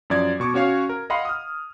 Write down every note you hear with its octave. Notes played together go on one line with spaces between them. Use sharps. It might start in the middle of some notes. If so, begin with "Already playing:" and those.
F#2 F3 D5 G#6
B2 C#6 D6
C#4 F#4 C#5 F5
A#4
D#5 F5 F#5 B5 C6
D#6 F6